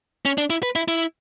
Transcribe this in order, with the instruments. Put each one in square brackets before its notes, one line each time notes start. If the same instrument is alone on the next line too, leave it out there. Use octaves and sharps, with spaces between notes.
[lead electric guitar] C#4
D4
E4
B4
E4
E4